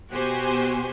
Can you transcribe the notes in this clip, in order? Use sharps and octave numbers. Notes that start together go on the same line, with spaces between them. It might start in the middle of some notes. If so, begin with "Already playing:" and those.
B2 F#4 G4 C5 G#5